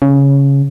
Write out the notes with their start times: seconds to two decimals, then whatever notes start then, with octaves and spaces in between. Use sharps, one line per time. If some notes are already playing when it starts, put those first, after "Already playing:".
0.02 C#3